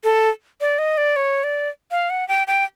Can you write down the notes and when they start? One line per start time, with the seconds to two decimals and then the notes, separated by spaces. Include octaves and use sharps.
0.04 A4
0.61 D5
0.79 D#5
0.97 D5
1.16 C#5
1.44 D5
1.91 F5
2.10 F#5
2.28 G5
2.47 G5